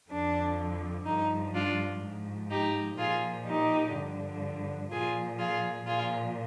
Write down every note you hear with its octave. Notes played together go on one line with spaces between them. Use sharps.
F2 D3 F3 D4
G2 F3 D#4
D4 F4
G#2 F3
D#4 G4
A#2 F3 F4 G#4
D#4 G4
G2 D3 F3
A#2 F3 F4 G#4
F4 G#4
A#2 F3 F4 G#4